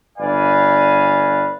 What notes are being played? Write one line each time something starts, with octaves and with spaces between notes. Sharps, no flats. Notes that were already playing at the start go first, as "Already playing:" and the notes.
G1 B4 D5 F5 G#5